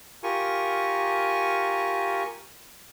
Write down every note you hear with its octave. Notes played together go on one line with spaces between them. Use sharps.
F4 G4 A#4 G#5 C#6